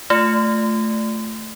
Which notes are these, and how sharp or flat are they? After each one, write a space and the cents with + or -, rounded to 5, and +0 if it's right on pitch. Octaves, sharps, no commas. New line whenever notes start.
A3 +0 F4 +0